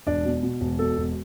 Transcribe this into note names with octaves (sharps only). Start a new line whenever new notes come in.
E1 D4 D5
B2
B2
E1
B2 A4
E1